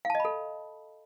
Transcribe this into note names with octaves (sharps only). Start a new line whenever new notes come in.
A4 D#5 F5 A5 B5